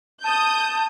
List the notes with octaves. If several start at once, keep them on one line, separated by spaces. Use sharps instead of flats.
A5 D#6 G6